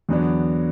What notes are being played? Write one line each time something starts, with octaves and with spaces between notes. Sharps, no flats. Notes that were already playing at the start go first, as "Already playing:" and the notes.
E2 D3 F#3 B3 D4